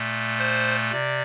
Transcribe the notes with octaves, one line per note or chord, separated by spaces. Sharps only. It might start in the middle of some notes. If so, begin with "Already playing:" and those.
Already playing: A#2 A3
C5
C3 D5